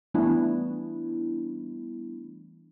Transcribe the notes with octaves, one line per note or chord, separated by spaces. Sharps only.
E3 G3 A3 B3 D4 E4